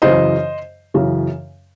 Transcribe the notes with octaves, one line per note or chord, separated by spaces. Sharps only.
F#2 C#3 E3 C5 D#5
F#2 C#3 E3